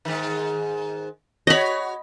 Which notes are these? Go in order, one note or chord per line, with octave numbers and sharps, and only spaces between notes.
G#2 D#3
F#4 G4 C#5 D#5 B5